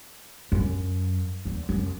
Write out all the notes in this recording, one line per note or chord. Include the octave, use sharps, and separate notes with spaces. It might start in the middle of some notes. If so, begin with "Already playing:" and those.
F#2
E2
F#2